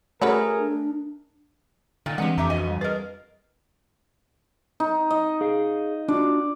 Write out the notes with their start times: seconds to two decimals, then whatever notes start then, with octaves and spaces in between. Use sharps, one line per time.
0.22 A3 C#4 F#4 G#4 A#4 B4
0.58 D4
2.06 A#2 D3 D#3
2.18 E3 G#3 C4 D4 G4 B4 F#5
2.38 F2 A3 G4 E5 A#5 D6
2.50 B3 F#4 D#5 G#5
2.67 G3
2.81 G#4 A#4 B4 D#5
4.80 D#4
5.11 D#5
5.41 G#4 F5
6.08 D4 F4 F#4 D5